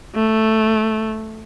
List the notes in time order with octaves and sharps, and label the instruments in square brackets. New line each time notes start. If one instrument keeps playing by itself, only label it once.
[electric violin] A3